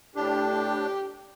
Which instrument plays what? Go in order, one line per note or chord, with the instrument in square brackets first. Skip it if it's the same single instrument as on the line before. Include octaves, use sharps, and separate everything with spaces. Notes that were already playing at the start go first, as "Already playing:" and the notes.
[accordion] A2 D4 [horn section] G4